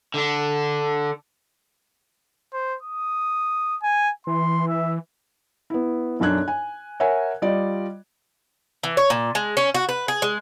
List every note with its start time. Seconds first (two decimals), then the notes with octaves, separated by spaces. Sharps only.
0.14 D3 D4
2.53 C5
2.83 D#6
3.83 G#5
4.27 E3 C6
4.68 E5
5.70 B3 E4
6.20 B1 F#2 D4 F#6 G#6
6.48 G#5
7.00 A#4 C#5 E5 F#5 G#5
7.42 G3 F4 D5 D#5
8.83 E3
8.97 C#5
9.10 A#2
9.35 G#3
9.57 C#4
9.74 F#4
9.89 B4
10.08 G#4
10.22 G#3